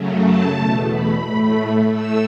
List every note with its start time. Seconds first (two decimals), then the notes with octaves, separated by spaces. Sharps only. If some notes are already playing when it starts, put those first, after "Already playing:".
Already playing: F#2 C#3 F#3 A3
0.25 A5
0.59 E2 B2 A3
0.91 B5
1.25 A2 A3
1.91 A2 A3 E6